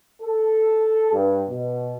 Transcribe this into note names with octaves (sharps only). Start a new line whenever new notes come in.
A4
G2
B2